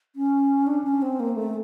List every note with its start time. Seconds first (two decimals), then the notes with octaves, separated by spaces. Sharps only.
0.16 C#4
0.67 D4
0.84 C#4
1.02 C4
1.20 A#3
1.36 A3